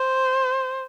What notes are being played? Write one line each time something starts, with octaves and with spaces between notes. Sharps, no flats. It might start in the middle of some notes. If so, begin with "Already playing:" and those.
Already playing: C5